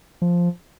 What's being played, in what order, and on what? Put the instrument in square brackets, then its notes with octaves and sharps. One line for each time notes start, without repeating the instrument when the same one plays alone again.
[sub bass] F3